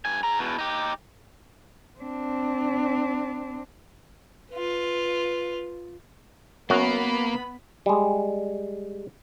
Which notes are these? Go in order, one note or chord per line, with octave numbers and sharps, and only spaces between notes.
G2 G#5
G#4 A#5
E2 B2
D#4 G4
C4 D4
F4 B4
F#2 A#3 B3 F#4 B5
G3 G#3